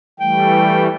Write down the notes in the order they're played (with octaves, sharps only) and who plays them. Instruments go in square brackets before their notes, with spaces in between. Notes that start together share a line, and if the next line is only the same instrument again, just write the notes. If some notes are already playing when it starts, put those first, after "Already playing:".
[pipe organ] E3 G3 A3 [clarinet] G5